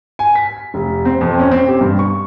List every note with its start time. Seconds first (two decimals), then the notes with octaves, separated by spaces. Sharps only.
0.19 G#5
0.35 B6
0.74 F1
1.05 C4
1.21 F2
1.39 C#4
1.51 C4
1.67 G4
1.81 G2
1.99 C#6